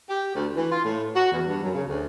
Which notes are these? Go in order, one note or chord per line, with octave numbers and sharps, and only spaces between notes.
G4
D2
E3
F4
A2
F#4
E2
G2
F#2
C#3
D2